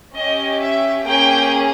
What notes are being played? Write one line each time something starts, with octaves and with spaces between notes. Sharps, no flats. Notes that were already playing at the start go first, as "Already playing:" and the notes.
C#4 G4 D#5
E5
A#3 C#4 G#4 G5